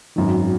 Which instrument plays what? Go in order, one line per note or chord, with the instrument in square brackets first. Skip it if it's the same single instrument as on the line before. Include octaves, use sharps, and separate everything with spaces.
[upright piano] G#1 F#2 D#3